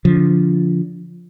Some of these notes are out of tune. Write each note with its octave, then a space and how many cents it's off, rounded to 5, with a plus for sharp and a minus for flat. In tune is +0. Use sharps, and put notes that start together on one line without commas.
D3 -40 F3 -5